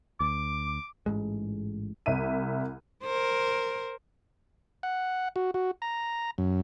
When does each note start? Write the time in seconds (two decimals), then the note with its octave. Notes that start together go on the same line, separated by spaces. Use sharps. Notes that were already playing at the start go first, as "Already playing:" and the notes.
0.20 D2 D6
1.06 A1 G#2 G#3
2.06 C2 E5 D#7
3.03 A#4 C5
4.83 F#5
5.36 F#4
5.54 F#4
5.82 A#5
6.38 F#2